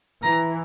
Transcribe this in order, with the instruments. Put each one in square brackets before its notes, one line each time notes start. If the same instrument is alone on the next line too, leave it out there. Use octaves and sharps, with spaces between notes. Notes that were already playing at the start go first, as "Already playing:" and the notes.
[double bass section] E3 [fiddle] A#5